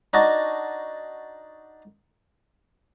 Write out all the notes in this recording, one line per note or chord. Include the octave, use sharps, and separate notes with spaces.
D4 D#4 F#4 A5